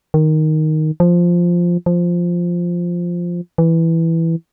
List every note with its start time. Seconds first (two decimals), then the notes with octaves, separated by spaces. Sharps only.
0.14 D#3
1.00 F3
1.86 F3
3.58 E3